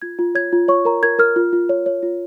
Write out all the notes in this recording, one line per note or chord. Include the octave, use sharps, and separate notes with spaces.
F4 G#6
F4
C#5 G#6
F4
C#5 C#6
A#4 A#5
A#4 G#6
A#4 F6
F4
F4
C#5
C#5
F4